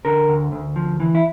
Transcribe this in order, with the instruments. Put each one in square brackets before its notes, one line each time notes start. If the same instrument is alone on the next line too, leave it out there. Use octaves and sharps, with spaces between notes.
[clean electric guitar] D3 A#4
D2
D2
F3
E3
E4